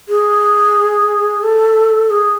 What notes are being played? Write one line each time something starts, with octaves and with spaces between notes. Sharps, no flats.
G#4
A4
G#4